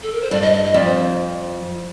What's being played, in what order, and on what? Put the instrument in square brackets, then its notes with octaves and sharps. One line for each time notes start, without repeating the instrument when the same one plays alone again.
[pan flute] A4
A#4
C5
[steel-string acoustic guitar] G2 [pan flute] D5
[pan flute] D#5
D#5
D#5
[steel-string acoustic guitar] F2 [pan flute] D5
[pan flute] C5